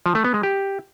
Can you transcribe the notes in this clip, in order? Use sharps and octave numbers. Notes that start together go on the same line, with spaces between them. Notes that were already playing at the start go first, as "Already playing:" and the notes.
F3
A3
B3
G#3
G4